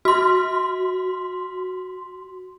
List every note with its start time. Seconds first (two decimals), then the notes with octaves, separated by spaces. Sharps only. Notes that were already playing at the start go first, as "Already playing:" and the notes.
0.05 F#4 C6